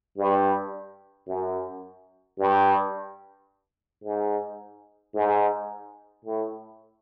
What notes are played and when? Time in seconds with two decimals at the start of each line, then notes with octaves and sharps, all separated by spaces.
0.18 G2
1.28 F#2
2.39 G2
4.04 G#2
5.14 G#2
6.25 A2